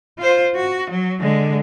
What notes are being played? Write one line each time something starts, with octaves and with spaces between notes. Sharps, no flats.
F4 C5
F#4
F#3
D3 G#3